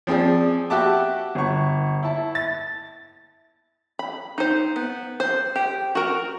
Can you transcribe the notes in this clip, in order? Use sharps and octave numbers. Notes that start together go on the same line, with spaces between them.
F3 C4 G#4 D5
F#4 G4 E5 A5 D6
G1 C#6
E4 A5
A6
B5
D#4 C5
B3
C5
G4
F#4 A#4